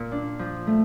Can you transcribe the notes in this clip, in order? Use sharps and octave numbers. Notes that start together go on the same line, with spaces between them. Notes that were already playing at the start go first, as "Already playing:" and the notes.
Already playing: A#2
D4
F3
A3